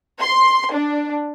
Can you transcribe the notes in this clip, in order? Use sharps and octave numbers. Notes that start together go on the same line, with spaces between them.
C6
D4